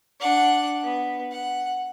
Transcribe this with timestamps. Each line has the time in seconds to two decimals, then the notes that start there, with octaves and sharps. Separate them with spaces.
0.20 D4 F#5
0.84 B3
1.32 F#5